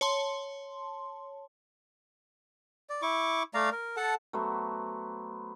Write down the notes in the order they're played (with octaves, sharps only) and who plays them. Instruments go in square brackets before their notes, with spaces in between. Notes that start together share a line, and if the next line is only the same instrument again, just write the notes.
[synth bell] C#5 A5 C6
[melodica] D5
E4 C#6 D6
A3 D5 F5 A#5
A#4
A4 F#5 A5
[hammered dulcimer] F#3 A3 B3 C5